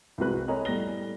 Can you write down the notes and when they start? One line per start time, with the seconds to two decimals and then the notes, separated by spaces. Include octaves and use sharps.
0.18 C2 G#3 C4 F#4 B4 F#6
0.48 A4 A#4 C#5 D#5 G#5 A#5
0.65 A2 G3 A3 B3 A#6 G7